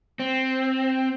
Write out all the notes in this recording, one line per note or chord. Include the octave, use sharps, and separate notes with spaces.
C4